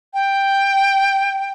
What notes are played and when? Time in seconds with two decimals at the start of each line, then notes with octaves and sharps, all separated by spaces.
0.14 G5